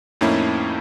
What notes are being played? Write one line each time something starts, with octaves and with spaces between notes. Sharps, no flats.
F2 A2 A#3 C#4 D#4 E4